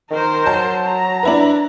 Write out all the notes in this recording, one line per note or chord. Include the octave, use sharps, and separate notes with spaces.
D#3 A#4 C5
F#3 A5
A#5
D4 E4 B4